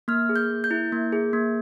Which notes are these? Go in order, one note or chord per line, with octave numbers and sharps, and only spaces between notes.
A#3 F6
G#4
G6
A#3
G6
E4
A#3
G#4
A#3